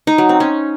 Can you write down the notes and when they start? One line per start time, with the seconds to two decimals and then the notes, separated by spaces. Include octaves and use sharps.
0.07 D#4
0.18 F#3
0.29 C4
0.40 C#4